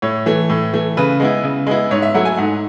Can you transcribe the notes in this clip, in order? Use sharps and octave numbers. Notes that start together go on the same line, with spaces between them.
A2 C#5
E3 A3
A2
E3 A3
C#3 B4
G#3 B3 E4
C#3
G#3 B3 E4
G#2 C#5
E5
F#3 A3 E4 F#5
G#5
G#2 F#5